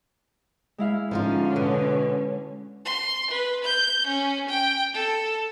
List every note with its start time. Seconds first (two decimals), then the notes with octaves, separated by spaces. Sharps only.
0.78 G#3 E4 F5
1.11 D3 F3 C#4 D#4 F4
1.56 B2
2.85 C6
3.30 B4
3.64 G6
4.07 C#4
4.49 G5
4.93 A4